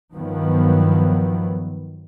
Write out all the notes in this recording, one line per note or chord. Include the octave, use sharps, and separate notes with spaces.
G2 D#3 F3 F#3 B3